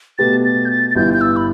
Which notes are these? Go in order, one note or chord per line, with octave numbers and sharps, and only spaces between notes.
B2 A3 G4 B4 A6
A6
G6
A6
A6
G1 G2 E3 G6
G6
E6
B5